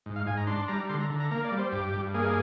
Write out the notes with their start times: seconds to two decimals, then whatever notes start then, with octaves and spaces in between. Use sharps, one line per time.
0.06 G#2
0.16 F5
0.26 G#2 G#5
0.37 A#5
0.47 D4 C6
0.68 G3 A#5
0.89 D3 C6
1.00 A#5
1.10 D3
1.20 A#5
1.31 A#3 A#5
1.44 D5
1.52 G3
1.59 C5
1.72 G2 G4
1.93 G2
2.14 A#3 G#4